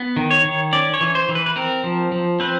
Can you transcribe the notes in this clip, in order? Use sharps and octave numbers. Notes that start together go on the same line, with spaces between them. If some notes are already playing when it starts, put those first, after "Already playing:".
Already playing: B3
D#3
C#5
D#3
C#4 D5
C#5
E3
C5
E3
B4
B4
C4 A#4
F3
F3
C4 B4